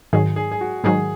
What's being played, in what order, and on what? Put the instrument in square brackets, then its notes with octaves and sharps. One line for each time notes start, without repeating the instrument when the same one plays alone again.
[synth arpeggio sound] G#2 D#3 F#3 [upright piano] G#4
[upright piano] G#4
G#4
F#4
[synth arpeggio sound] G#2 D#3 F#3 [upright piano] G#4